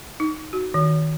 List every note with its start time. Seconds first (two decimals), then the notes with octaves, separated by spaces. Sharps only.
0.20 D#4
0.53 F#4
0.74 D#3